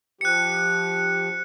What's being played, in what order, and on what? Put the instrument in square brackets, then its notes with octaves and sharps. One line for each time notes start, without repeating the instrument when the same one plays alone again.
[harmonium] F3 G4 [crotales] F#6 C#7